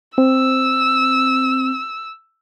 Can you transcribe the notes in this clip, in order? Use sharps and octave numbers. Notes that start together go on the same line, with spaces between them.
C4 E6